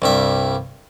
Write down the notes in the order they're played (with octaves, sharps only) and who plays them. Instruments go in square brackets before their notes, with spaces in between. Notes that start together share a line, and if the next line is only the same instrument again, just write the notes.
[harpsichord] C2 G2 E5